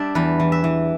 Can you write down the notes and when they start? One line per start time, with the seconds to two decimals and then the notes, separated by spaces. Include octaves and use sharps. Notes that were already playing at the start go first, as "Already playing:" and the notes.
Already playing: G3 D4 D5 E5
0.15 E2 B4
0.40 E3
0.52 E5
0.64 E3